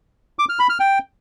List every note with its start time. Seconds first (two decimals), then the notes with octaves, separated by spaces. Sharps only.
0.39 D6
0.49 F6
0.59 B5
0.69 F6
0.80 G5